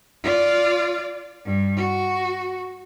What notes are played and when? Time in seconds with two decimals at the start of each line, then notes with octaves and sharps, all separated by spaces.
0.23 F4 D5
1.45 G2
1.77 F#4